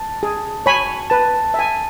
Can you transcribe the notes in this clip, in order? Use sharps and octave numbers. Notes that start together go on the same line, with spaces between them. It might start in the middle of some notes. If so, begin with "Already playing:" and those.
Already playing: A5
G#4
C#5 G#5 B5
B4 A5
E5 G#5